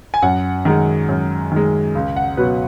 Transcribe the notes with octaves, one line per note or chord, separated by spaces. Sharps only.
G#5
F#2 F#5
D#3 G#3
F#2
D#3 G#3
C#2
F#5
B2 F#3 B4